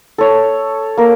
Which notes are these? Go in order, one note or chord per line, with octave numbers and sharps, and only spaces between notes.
A4 C#5
A#3 A#4